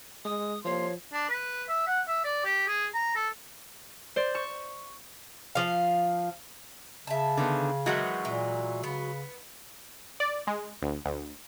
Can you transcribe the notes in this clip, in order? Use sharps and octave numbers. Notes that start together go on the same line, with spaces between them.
G#3 D#6
C2 F3 A#3 C#5 C6
D4
B4
E5
F#5
E5
D5
G4
G#4
A#5
A4
C5 D5
C#6 E7
F3 F5
C#3 E5 A5
D3 D#3 B3
D#3 E3 F#3 G#3 B3 F#4
A#2 E3
C#3 B3
D5
G#3
D2
D2